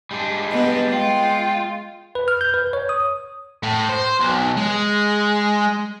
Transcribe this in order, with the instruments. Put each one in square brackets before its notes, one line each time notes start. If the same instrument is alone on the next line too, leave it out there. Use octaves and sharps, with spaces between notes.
[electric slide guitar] G3 G#3 D4
[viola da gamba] B3 [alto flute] D#5
[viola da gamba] G#3 [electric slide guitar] F4 [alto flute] G5
[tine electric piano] B4
F6
G6
B4
C#5
D#6
[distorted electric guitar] A2
C5
B1
G#3